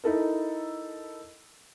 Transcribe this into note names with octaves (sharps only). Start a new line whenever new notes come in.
D#4 E4 A4 A#4